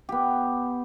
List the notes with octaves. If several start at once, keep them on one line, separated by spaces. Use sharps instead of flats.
B3 G4